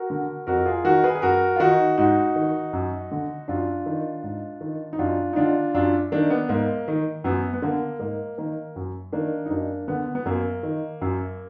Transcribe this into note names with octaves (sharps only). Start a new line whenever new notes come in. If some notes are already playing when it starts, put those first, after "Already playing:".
Already playing: F#4 A#4
D3
F2 F#4 A#4
F4 G#4
D#3 F#4 A#4
G#4 B4
G#4
F#2 F#4 A#4
F4
D#3 D#4 F#4
G#2 D#4 F#4
D#3
F#2
D3
F#2 D4 F4
D#3
G#2
D#3
D#4
F#2 D4 F4
D#4
D3 D4 F4
F#2 D4 F4
D#3 A#3 D4
B3
G#2 A#3
D#3
F#2 B3
B3
D3 A#3
G#2 A#3
D#3 A#3
F#2
D#3 A#3 D4
D#4
F#2 A#3 D4
D3 B3
B3
F#2 A#3
D#3
F#2